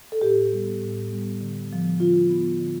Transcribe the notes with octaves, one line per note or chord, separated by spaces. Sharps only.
A4
A2 G4
G3 B3
A2
G3 B3
D3
F3 B3
D3 F4
F3 B3
D3